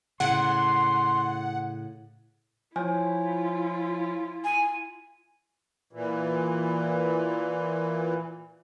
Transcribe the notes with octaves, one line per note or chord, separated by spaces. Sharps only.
A2 C#3 F#5 C6
F3 E4 F4 C#5 G#5
G#5
A#2 E3